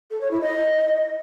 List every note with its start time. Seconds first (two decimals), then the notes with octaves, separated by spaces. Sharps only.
0.11 A4
0.21 C#5
0.31 E4
0.41 D#5